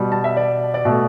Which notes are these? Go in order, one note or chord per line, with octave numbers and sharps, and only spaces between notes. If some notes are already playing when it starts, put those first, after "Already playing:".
Already playing: B2 G3
A5
E5
D5
D5
B2 A3 E5